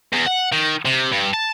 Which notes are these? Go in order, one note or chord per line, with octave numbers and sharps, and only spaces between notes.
E2
F#5
D#3
C3
G2
A5